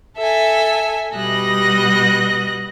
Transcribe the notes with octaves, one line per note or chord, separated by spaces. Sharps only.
A4 E5 G#5
B2 G3 D#5 F#6 A#6